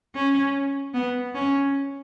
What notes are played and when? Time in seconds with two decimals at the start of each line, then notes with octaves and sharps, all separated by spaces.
0.15 C#4
0.94 B3
1.34 C#4